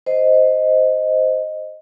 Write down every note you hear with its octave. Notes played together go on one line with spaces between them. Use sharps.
C5 D#5